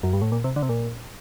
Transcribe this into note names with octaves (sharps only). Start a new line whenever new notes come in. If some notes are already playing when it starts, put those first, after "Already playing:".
F#2
G2
A2
A#2
C3
D3
C3
A#2